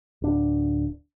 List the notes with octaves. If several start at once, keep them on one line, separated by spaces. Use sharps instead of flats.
D1 D4